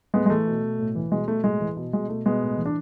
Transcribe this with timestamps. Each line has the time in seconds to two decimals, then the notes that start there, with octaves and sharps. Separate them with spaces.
0.14 A2 G#3 B3
0.26 G#3
0.30 E3 A3
0.47 B2
0.64 B2
0.79 A2
0.95 E3
1.11 B2 G#3
1.28 B2 A3
1.44 A2 G#3
1.60 E3
1.77 B2
1.93 B2 G#3
2.09 B2 A3
2.26 B2 G#3 B3
2.42 A2
2.58 E3
2.66 D4